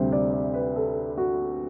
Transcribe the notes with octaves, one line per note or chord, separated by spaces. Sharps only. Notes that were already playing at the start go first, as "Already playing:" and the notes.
Already playing: D2 C3 G3 C5
D5
D5
B4
A4
F#4